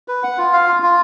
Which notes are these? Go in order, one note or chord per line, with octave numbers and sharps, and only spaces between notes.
B4
F#5
F4
F5
F4
F4